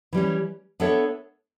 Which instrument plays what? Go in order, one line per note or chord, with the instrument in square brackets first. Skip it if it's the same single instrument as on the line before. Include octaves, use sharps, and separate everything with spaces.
[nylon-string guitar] E3 G3 C#4
B3 D4 A4 C#5 E5